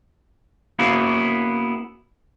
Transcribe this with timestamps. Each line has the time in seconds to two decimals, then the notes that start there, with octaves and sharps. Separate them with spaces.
0.79 A#3 B3 C#4 E4 F#4 G#4